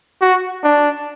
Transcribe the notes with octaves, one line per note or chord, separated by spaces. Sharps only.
F#4
D4